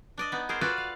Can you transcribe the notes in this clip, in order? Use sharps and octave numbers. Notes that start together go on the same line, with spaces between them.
D4 D5 D#5
B3 D#4
G#4 A#4 C5 D5 A#5
F4 F#4 A4 B4 D5
F5